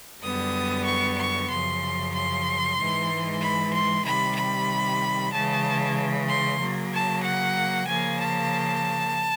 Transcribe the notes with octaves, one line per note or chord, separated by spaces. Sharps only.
F#2 D3 G3 B3 D#6
C#6
C#6
F#2 C#3 F3 C6
C6
G#2 E3 G#3
B5
C6
C3 D#3 G3 B5
B5
C#3 E3 G#3 A5
C6
C#3 F#3 A#3
A5
F#5
C#3 F3 A#3 G#5
A5